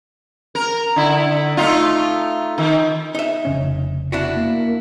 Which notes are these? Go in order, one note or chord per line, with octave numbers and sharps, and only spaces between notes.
A#4
D3 E4
A3 D#4 F4
D#3
D#4 E5
F1 C#3 C#4
D4 E4 F#4
A#3